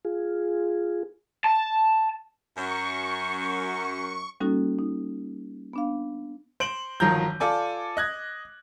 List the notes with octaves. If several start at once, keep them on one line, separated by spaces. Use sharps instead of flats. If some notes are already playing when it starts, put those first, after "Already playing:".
F4 G#4
A5
F#2 C#6
G3 A#3 C#4 D#4 F#4 A4
D#4
B3 D4 F5
C5 D7 F#7
G1 D#3 F3 F#3 A#5 G6
F4 A4 D5 G#5 D6
D#5 F#6 G#6